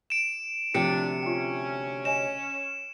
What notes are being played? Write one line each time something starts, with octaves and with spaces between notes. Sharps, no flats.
D7 E7
D2 C3 F3 D4 F4 G4 C#7
C#4 F4 G5
C#5 D#5 G#5 E7